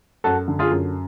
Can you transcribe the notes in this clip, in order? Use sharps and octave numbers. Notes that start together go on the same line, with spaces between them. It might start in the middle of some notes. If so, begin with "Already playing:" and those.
F#2 F#4 A4
D3
F4 G#4
F#2